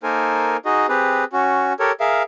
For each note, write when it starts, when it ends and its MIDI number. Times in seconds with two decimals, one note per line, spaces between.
0.03 0.57 58
0.03 0.57 63
0.03 0.57 69
0.03 0.57 70
0.03 0.57 72
0.03 0.57 80
0.65 0.87 63
0.65 0.87 66
0.65 0.87 68
0.65 0.87 75
0.89 1.24 60
0.89 1.24 67
0.89 1.24 68
0.89 1.24 71
1.33 1.73 61
1.33 1.73 66
1.80 1.92 67
1.80 1.92 69
1.80 1.92 70
1.80 1.92 73
2.00 2.23 68
2.00 2.23 70
2.00 2.23 76
2.00 2.23 77